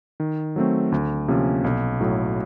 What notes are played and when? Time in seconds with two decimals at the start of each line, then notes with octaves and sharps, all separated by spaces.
0.20 D#3
0.56 F#3 A3 C4
0.92 D2
1.28 C3 F3 A#3 C#4
1.64 B1
2.01 A2 F#3